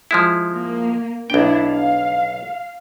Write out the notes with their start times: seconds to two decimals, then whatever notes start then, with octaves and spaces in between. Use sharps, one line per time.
0.11 F3 G#3 E4
0.56 A#3
1.30 B1 B3 D4 E4 G5
1.65 F5